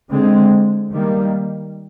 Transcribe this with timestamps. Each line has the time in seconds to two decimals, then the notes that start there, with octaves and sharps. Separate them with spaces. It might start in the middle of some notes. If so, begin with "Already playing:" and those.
0.10 D3 G#3 C4
0.92 D#3 G3 A#3